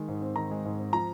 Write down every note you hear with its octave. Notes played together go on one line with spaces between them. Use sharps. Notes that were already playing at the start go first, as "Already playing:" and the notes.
Already playing: D#3 G#3
G#2
C4
D#3 A#5
G#3
G#2
C4
F3 A#5